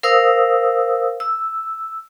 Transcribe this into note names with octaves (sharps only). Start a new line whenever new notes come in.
A#4 C5 F5 D#6 E6
E6